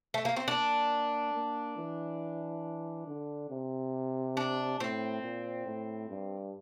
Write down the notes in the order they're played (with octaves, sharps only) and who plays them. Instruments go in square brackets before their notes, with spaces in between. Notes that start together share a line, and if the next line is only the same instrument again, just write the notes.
[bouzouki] A3
A#3
C4
[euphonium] A#3 [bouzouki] D4
[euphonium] A#3
E3
D3
C3
[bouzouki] D4
[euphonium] A2 [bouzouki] C4
[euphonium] A#2
A2
G2